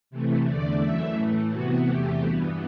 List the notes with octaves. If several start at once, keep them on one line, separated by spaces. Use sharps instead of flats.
C3 E3 A3
E2 D3 A3 D5
F#2 E3 A3 E5
A2 E3 A3
C3 E3 B3 F#4
E2 C3 E3 A3 G4
G2 E3 B3 F#4